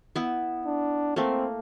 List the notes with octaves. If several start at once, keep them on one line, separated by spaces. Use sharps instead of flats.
B3 E4
D4
A3 A#3 C4